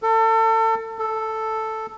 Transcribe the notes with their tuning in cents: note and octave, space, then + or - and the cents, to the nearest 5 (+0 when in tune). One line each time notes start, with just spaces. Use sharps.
A4 +30
A4 +0